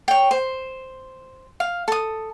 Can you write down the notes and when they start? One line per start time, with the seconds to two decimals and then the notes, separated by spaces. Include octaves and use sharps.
0.08 C#5 G5
0.31 C5
1.60 F5
1.88 A4 D#6